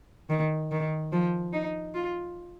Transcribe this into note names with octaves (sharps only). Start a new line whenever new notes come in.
D#3
D#3
F3
D#4
F4